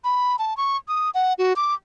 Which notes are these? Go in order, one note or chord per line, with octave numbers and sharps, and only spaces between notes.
B5
A5
C#6
D#6
F#5
F#4
D6